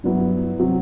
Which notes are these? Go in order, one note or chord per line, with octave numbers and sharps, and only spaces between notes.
G2 F#3 B3 E4
C3 F#3 C4